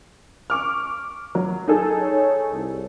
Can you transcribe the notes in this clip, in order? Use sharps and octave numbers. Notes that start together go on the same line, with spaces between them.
C#6 D6 F6
F#3
D#4 G#4 A4
C#5
C2